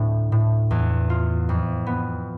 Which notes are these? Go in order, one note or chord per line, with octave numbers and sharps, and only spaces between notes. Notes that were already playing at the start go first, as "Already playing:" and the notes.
Already playing: D2 A2 C4
A2
E2
F4
F2
B3